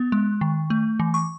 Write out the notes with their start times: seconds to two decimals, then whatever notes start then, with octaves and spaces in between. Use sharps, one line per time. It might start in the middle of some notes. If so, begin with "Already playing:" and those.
Already playing: B3
0.12 G#3
0.41 D#3
0.70 A3
1.00 E3
1.14 C#6